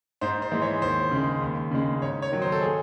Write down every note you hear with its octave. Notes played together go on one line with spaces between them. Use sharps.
G#2 C5
C5
E3 G#3
C#5
D#2 C5
C#3 G#3
D#2
C#3 G#3
G#2 C#5
C#5
D#3 F#3
C5
A4
G#4